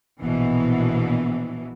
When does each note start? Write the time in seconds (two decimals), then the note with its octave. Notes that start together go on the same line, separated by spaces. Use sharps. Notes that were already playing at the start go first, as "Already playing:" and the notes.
0.21 A#1 B2 E3